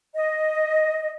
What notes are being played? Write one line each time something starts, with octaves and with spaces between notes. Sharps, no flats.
D#5